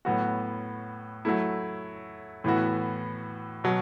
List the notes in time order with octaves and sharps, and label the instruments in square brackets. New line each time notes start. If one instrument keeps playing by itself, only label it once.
[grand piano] A2 F#3 B3 F#4
F#3 A3 E4
A2 E3 B3 F#4
B2 F#3